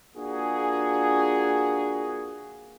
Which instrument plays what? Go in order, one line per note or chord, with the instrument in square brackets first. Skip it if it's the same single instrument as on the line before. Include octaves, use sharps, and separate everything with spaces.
[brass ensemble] A#3 D4 F4 F#4 G#4